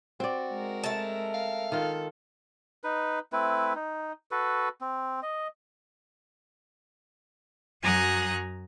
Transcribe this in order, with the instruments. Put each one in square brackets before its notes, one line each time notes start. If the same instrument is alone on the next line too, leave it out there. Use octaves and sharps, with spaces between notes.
[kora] C4 D5 [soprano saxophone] F#4
[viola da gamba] G#3 A#4
[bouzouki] A3 A5
[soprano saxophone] F5
[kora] D#3 F4 [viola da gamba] A4
[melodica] D#4 B4
A3 C4 E4 B4
D#4
F#4 A4 B4
C4
D#5
[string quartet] F#2 F#3 G#5 A#5 D#6 F#6